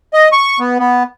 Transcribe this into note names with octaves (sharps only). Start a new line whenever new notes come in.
D#5
C#6
B3
B3